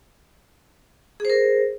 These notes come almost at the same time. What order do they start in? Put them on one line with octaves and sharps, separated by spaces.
G#4 C5 A#4